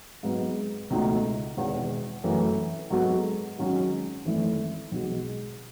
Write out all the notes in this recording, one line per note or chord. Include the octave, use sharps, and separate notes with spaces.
G#2 F#3 B3
C#2 B2 A3 D#4
E1 E2 D#3
F#2 E3 A3
G#2 F#3 B3 F#4 A4
G#2 D#3 F#3 C#4 F#4
G#1 F#2 E3 A3 E4
B1 B2 G#3